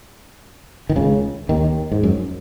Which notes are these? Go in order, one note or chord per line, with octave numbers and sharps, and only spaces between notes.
D#3
C#2 C#3
D#2 D#3
G#2
F#2